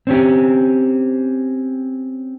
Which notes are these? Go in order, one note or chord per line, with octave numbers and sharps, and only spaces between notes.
C4 C#4 G4